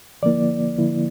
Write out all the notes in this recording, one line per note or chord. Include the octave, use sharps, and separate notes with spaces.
D3 F3 A#3 E4 D5
D3 F3 A#3 E4